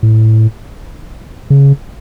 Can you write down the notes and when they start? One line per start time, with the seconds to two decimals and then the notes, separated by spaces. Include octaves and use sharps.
0.03 A2
1.50 C#3